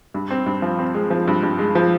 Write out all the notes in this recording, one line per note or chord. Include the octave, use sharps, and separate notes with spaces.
G2
C4
G2
F3
C4
G#3
F3
G2
G2
G#3
F3